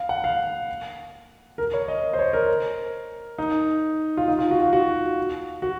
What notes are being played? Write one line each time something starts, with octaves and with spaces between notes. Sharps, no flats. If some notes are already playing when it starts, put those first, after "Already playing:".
Already playing: F5
F#5
F5
A#4
C#5
D#5
C5
C#5
A#4
D#4
F4
D#4
F4
F#4
F4
F#4
F#4